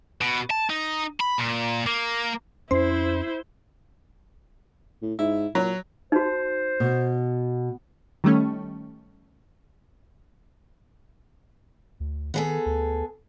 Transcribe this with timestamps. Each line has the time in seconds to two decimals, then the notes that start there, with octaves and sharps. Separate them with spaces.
0.21 B2
0.50 A5
0.70 D#4
1.20 B5
1.38 A#2
1.87 A#3
2.71 F2 C#4 E4 C5
5.02 A2
5.19 G#2 E4
5.55 A#2 F#3
6.12 D#4 F#4 C5
6.80 B2
8.24 D#3 G3 A3 C#4
12.00 D2
12.34 D#3 B3 G#4 A4
12.66 D2